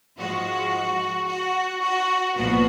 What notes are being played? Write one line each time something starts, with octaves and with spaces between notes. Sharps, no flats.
G#2 F3 G#3 F#4
F#4
F#4
B1 A#2 F3 B3 F#4